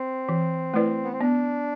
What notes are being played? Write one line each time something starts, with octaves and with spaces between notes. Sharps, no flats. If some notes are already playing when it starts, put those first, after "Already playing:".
Already playing: C4
E3
A3 E4 B4 D5
B3
C4
B3 D4